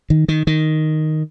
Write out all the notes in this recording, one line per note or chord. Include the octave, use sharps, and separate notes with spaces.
D#3
D#3
D#3